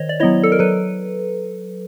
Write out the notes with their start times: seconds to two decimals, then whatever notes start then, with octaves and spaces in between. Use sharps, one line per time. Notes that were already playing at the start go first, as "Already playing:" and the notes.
Already playing: D#3 C5 C#5 D#5
0.09 D5
0.20 F#3 B3 E4 C#5 D#5
0.43 A4
0.52 A#4
0.59 F#3 A4 B4